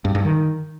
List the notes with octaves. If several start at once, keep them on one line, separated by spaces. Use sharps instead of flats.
G2
G2
D#3